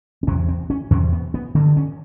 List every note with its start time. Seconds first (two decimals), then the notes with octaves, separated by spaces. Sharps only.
0.23 C4
0.27 E2 C3 C#4
0.49 C4
0.70 C#4
0.91 E2 C3 C#4
1.13 B3
1.34 B3
1.55 D3 C4
1.58 G2
1.77 C#4